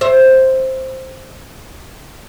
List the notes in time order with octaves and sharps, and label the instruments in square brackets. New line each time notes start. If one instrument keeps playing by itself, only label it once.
[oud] C5 E5